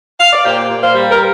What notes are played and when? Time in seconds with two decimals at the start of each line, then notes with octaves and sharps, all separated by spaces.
0.20 F5
0.33 D5
0.45 A#2 G4 C5
0.70 A#2
0.83 C5 F5
0.95 G3
1.11 A#4